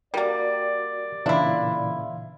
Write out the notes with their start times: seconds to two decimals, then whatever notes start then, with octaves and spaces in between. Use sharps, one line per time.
0.14 G3 A#3 F#4 G4 A#4 D5
1.26 A#2 C#3 E3 D4 E4 E5 F5 C6